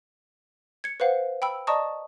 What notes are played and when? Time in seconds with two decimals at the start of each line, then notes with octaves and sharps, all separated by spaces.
0.84 G#6 C#7
1.00 B4 C5 F5 F#5
1.42 G5 B5 E6
1.67 D5 D#5 A5 A#5 C#6 D#6